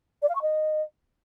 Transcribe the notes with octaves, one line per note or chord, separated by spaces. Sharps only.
D5
F5
C#6
D#5